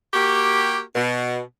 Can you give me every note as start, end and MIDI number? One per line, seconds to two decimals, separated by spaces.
0.14 0.81 58
0.14 0.81 66
0.14 0.81 67
0.95 1.40 47